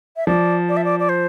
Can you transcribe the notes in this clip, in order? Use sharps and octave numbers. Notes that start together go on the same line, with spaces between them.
E5
F3 D5
D5
E5
D5
D5
C5